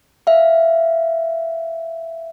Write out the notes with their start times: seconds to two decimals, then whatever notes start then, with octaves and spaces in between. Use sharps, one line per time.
0.27 E5 F5